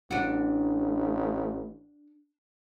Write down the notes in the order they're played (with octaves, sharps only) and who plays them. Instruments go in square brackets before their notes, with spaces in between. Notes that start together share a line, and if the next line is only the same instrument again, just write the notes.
[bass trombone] A1 [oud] D4 F#4